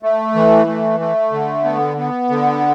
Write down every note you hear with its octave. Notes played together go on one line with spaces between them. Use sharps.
A3
E3
A3
A3
D3
B3
B3
D3